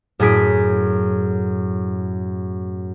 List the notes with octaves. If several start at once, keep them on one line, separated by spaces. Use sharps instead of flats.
F#2 A2 G#4 B6 D7